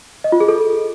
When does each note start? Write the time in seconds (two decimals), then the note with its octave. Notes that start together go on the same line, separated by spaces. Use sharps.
0.24 D#5
0.32 F4
0.40 G#4
0.48 A4